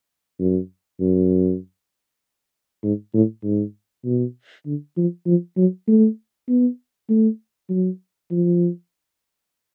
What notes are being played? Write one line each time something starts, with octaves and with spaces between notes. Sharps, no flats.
F#2
F#2
G#2
A2
G#2
B2
D3
F3
F3
F#3
A3
B3
A3
F#3
F3